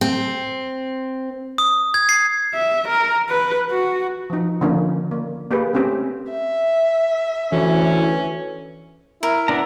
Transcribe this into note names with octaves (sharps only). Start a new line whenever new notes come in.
C4
D#6
G#6
C7
E5
A#4
B4
F#4
F3 D#4
D3 D#3 F3 A#3 C#4 D#4
A#3
A#3 G4 G#4 B4
G#3 A3 C4 C#4 G4
E5
D2 E3 C#4
E4 A#4
B3 D4 A#5